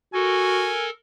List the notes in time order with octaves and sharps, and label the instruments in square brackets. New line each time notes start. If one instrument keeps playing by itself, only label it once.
[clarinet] F#4 [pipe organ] A4 A#4 [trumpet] G#5